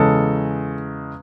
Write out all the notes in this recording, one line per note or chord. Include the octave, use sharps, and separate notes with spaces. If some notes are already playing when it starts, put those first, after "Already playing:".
Already playing: E2 C#3 G#3 A4